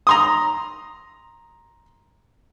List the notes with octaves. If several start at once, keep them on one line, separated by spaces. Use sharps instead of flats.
A#5 C6 D#6